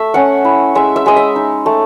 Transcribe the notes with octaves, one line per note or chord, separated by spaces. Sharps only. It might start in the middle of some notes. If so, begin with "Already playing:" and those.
Already playing: A3 E5
C#4 F#5
E4
G#3 E5
E5
G#3 D#5
E5
D#4
A3